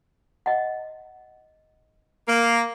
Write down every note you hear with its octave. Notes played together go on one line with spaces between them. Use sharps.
D#5 F#5
A#3